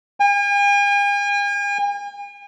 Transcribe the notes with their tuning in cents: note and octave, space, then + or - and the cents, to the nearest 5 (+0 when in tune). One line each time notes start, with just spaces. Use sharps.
G#5 -45